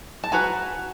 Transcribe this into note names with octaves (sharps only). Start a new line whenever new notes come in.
A5
F#4 B4 G#5 A#5